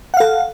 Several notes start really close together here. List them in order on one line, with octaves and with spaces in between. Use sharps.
F#5 F5 A4